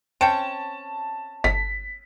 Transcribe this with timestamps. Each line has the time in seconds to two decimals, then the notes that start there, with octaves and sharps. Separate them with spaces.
0.21 C4 C#4 G5 A5 C#7
1.44 G1 B6